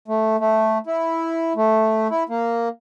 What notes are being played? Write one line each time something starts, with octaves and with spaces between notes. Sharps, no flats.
A3
A3
E4
A3
E4
A#3